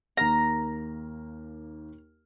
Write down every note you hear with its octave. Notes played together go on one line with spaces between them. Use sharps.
D#2 A#3 A#5 F6